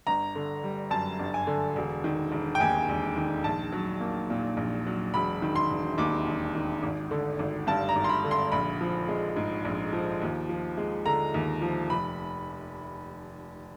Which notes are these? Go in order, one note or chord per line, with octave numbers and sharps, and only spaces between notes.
G1 A#5
D3
G3
F#2 A5
G1
G#5
D3
E1
D#3
E1
G5
D#2 G#5
E1
D#3
A#1 A5
F#3
A#3
A#2
A#1
F#3
E1 B5
D#3
C6
E1
D#2 D6
E1
D#3
G#1
D3
G#1
G2 A5
A#5
G#1
C6
B5
D3
C6
A#1 B5
F3
G#3
G#2
A#1
F3
D#2
F3
G#3
D3 A#5
D#2
F3
F1 B5